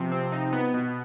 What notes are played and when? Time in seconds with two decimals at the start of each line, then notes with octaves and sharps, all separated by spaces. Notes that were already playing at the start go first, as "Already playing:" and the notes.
Already playing: C3 F3
0.12 C4
0.32 D#4
0.53 B3
0.74 B2